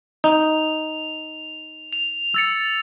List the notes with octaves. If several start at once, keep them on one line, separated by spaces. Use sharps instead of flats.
D#4 F7
F7
E6 A6 C#7